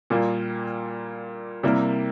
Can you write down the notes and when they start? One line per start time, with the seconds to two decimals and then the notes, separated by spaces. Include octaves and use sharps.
0.10 A#2 G3 A#3 F4
1.63 C3 G3 A#3 E4 A#4